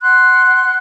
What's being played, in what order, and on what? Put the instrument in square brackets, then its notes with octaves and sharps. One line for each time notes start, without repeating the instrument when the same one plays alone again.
[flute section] F#5 C6 F#6